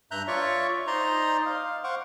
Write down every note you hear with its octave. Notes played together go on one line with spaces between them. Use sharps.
G2 E5 A#5 F#6 G6
F4 C#5 D5 E5 C#6
D#4 C5 D5 D#5 A#5 C6
F5
C5 F5 F#5 C#6 D6